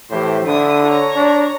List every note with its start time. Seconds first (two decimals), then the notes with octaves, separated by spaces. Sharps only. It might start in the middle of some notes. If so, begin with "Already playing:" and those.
0.10 A2 E3 G4 C5
0.46 D3 D4 E4 D#6
0.85 C#5 A#5
1.16 D4